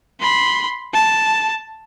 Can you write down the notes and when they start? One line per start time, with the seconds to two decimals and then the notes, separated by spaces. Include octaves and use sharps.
0.20 B5 C6
0.94 A5